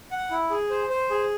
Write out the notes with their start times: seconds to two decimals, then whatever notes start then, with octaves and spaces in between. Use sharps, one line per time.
0.11 F#5
0.31 E4
0.50 G#4
0.70 C5
0.90 C5
1.10 G#4